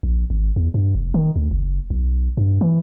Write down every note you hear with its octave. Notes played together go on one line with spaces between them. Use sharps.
A#1
G#1
E2
G2
F1
D#3
D2
F#1
B1
G2
E3